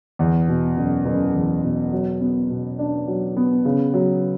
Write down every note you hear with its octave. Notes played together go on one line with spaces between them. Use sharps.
E2
B2
F#1
F#1
E2
B2
F#3
B3
B2
D4
F#3
B3
C#3
F#3